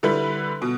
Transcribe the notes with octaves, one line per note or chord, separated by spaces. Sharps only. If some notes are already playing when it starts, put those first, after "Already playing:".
D3 G3 E4 B4
B2